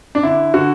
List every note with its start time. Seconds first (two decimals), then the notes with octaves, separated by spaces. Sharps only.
0.15 D4
0.23 D3 E4
0.54 D3 F#4